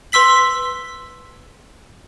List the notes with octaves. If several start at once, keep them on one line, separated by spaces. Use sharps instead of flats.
B4 C6 E6 B6 F#7